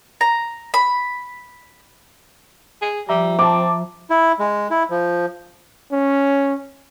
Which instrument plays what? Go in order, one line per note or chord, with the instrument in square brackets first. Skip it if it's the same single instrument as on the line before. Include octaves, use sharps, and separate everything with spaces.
[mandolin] A#5
B5
[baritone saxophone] G#4
[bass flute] F3 [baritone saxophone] G3 [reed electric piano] E5 A#5
[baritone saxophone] C4 [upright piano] A5 D6
[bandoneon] E4
G#3
E4
F3
[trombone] C#4